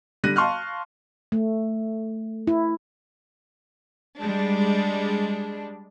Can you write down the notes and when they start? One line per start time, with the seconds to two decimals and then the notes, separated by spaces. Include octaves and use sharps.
0.24 D3 G3 F#6 A#6 D#7
0.36 F5 A5 C6 C#6 F6 F#6
1.32 A3
2.47 E4
4.19 G3 G#3 D4